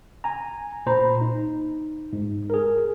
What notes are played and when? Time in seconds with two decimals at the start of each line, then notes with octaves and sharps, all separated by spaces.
0.24 G#5 A#5
0.86 A#2 C5 A#5 B5
1.21 D#4
2.13 G#2
2.50 G#4 A#4